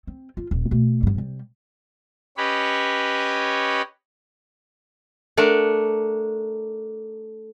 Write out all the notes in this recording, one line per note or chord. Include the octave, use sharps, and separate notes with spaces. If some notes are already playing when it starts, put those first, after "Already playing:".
C4
F4
D#1
B2 A3
G2 D3
C3 G3
C#4 G4 B4 C#5 D#5 B5
A3 D4 A#4 F#5